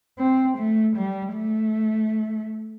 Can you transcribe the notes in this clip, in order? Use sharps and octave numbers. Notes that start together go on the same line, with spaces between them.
C4
A3
G3
A3